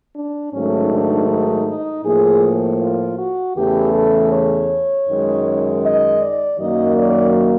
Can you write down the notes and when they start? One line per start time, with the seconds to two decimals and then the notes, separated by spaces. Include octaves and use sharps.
0.16 D4
0.53 G#2 D#3 F#3 A3 C#4
0.92 D4
1.29 D#4
1.68 D#4
2.05 A2 F3 A#3 G#4
2.81 F4
3.18 F#4
3.57 E2 C#3 E3 A3 G4
3.94 A4
4.32 C#5
5.07 F#2 D#3 G#3
5.83 D#5
6.22 D5
6.59 F#2 D#3 F#3 A#3 D#5
6.97 D5